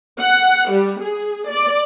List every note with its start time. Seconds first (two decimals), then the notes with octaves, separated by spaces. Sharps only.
0.20 F#5
0.71 G3
1.02 G#4
1.49 D5